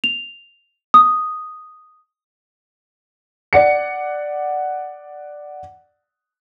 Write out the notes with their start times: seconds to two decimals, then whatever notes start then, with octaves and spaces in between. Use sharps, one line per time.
0.04 F7
0.94 D#6
3.53 D5 F#5 C#7